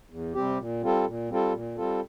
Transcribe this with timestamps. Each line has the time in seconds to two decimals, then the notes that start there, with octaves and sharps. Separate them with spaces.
0.10 E2
0.34 C3 G3 C4 G4
0.58 A#2
0.82 G3 C4 F4 A4
1.06 A#2
1.30 G3 C4 F4 A4
1.53 A#2
1.77 G3 C4 F4 A4